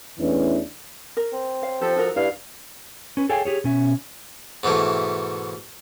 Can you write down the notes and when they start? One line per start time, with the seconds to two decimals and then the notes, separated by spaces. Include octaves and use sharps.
0.19 E2 E3 A3 C#4 D4
1.17 A#4
1.33 C4
1.62 C#5 F5
1.81 F3 G4 A4 C5
1.96 D#4 F#4 A#4
2.16 G2 E4 F5
3.17 C#4 B4
3.29 G#4 A4 C#5 F5 G5 G#5
3.45 G4 G#4 C#5
3.64 B2 C#4 E5
4.63 G#2 B2 E3 A3